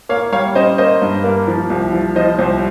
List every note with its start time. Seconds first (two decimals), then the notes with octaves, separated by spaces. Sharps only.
0.09 A#3 C#5 F5
0.32 G3 C#5 F5
0.55 C#4 C5 D#5
0.78 A#3 C5 D#5
1.02 G2
1.24 A#3
1.47 F3
1.70 C2
1.93 F3
2.16 F3 C5 D#5
2.39 C2 C5